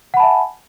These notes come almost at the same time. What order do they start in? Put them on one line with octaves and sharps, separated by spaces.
F#5 B5 A5 E5 G#5